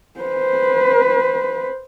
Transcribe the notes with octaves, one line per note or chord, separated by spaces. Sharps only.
B4 C5